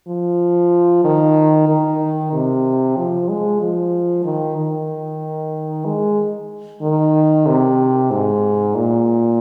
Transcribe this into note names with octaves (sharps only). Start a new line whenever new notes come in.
F3
D#3
D#3
C3
F3
G#3
F3
D#3
D#3
G#3
D#3
C3
G#2
A#2